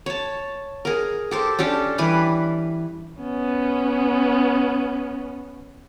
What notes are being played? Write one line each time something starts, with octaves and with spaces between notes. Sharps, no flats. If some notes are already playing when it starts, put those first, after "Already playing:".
C#5 A5
G#4 A#4
G4 A4 C5
C#4 D4 G4 A4
E3 G3 B4 B5
B3 C#4